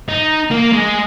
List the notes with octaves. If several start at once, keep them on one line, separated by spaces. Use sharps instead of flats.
D#4
A#3
G#3